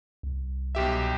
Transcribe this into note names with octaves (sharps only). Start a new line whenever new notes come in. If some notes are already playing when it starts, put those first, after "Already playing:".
C2
B1 G4 E5